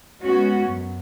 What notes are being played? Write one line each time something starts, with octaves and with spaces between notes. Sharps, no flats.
G#3 B3 C#4 F#4
F#2